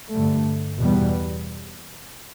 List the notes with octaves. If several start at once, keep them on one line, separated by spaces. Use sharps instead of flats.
G2 D3 A3
E2 B2 G3 B3